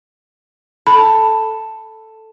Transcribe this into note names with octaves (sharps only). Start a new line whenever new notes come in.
A4 B5